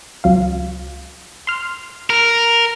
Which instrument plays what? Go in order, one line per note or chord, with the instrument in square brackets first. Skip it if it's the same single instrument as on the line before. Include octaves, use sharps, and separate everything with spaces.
[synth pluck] C#2 F#3 F5
C6 F6
[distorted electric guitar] A#4